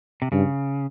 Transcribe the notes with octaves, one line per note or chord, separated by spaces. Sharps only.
C3
G2 C#3